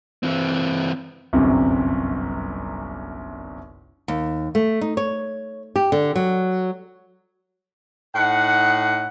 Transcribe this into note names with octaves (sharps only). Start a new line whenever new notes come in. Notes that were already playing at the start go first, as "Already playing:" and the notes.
E3 C4
G1 C2 F#2 C3
D#2
A3
D#4
C#5
G4
D3
F#3
A2 D#4 F#5